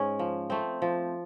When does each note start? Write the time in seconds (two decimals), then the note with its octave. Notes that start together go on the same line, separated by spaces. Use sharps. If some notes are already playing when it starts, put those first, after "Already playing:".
Already playing: G#2 G#3 C#4
0.19 F3
0.50 A3 C4
0.82 F3